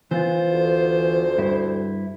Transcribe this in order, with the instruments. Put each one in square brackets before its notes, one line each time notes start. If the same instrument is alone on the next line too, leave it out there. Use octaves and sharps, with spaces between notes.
[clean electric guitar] E3 B3 F4 [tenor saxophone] C5
[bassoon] D2
[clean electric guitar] G2 E4